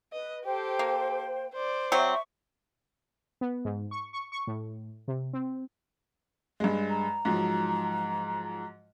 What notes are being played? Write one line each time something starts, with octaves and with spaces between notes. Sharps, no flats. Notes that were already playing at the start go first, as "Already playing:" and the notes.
B4 D#5
G4 A4 C5 G5
A#3
C5 D5
F#3 C4 E5 C#6
B3
G#2
C#6
C#6
C#6
A2
C3
C4
G2 G#3
A#5
G#2 F3 F#3